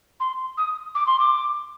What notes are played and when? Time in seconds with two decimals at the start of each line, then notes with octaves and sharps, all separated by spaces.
0.20 C6
0.57 D#6
0.95 D6
1.06 C6
1.19 D6